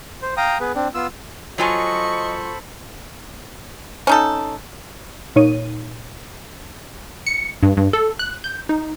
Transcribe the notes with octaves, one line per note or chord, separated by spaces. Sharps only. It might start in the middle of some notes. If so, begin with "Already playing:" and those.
C5
F5 G5 A#5 D#6
B3 G#4 B4
C4 D4
B3 F4 E6
F#3 F4 A4 C5 D#5 G#5 B5 C#6
C#4 D#4 A4
A#2 D#4 C#5 D#7
C#7
G2
G2
A4
F#6
G6
D#4